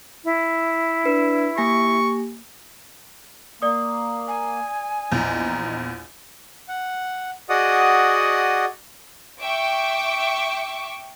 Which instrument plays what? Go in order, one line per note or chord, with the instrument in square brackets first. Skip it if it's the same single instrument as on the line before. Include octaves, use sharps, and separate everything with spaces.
[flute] E4
[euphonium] D4 [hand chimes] B4
[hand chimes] A#3 G#5 A#6 [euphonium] G4 [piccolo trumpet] C#6
[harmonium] A#3 [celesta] D5 D#6
[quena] G#5
[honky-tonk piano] A#1 E2 [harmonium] D#4
[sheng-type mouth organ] F#5
F#4 G#4 D5 D#5 F#5 D#6
[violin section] E5 G5 C#6 D6